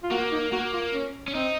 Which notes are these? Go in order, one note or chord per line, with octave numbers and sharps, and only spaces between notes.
F4
A#3 F#4
D#4
A#3 F#4
F4
C#4
C#4
C4 D#4